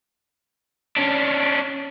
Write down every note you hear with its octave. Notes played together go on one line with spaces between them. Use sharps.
C#4 D4